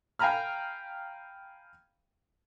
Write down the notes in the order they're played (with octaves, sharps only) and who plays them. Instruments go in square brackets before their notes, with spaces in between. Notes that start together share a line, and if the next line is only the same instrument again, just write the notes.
[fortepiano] F5 G5 G#5 A#5 B5 F6